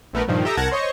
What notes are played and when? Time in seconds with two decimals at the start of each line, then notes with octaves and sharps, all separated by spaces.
0.13 A#1 A3 B3 A#4 B4
0.28 G2 A#2 D#3 F3
0.45 G4 A4 E5 A#5 D#6
0.57 C2 A#4 F#5 A5 G#6 A#6
0.71 C5 C#5 D#5 C#6